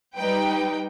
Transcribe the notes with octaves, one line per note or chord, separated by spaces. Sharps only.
G3 D#4 B4 G5